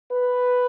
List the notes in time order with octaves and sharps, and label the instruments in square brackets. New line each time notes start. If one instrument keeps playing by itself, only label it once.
[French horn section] B4